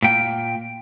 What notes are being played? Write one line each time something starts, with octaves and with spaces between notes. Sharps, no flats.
A#2 G5